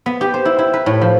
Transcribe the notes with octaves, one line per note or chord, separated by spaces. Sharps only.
B3
G4
C5
E4
E4
B4
A2
F3